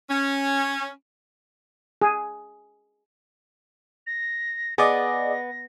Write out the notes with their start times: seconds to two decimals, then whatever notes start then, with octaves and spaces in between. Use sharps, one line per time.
0.10 C#4
2.02 G#4
4.07 A#6
4.78 B3 G#4 D5 D#5 A#6